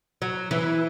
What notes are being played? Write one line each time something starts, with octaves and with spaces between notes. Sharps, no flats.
F#3
E3